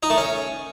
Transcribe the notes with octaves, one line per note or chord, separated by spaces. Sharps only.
D#4
A3
C#4